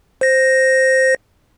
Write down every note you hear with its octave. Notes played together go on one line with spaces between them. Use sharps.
C5 A#6